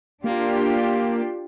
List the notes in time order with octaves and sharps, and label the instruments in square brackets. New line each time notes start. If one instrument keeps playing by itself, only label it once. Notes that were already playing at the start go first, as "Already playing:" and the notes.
[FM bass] A#3 [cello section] D4 F4 G4